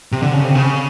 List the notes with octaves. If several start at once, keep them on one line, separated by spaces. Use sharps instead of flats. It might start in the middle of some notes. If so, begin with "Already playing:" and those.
C3
D3
C#3
C3
C#3